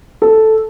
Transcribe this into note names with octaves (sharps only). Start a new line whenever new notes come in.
A4